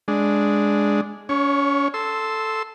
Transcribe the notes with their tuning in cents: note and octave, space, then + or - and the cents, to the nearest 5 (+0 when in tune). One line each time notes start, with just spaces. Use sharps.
G#3 +0 D4 -5
C#4 +35 C#5 +0
A4 +0 C6 +0 E6 -10